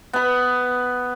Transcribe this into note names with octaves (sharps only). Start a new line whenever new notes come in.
B3 B5